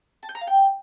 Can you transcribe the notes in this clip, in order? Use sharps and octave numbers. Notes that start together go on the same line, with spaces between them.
A5
G6
A#5
F5
G5